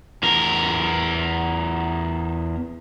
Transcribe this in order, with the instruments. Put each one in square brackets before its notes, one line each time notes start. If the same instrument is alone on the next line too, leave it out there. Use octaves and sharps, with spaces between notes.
[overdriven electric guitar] E2 A#4